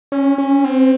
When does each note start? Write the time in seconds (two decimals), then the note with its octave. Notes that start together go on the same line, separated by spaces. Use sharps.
0.12 C#4
0.38 C#4
0.64 C4